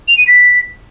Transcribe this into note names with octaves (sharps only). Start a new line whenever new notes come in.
F7
D#7
B6